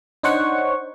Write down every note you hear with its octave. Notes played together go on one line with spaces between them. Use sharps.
D4 D#4 C5 C#5 F#5 C#6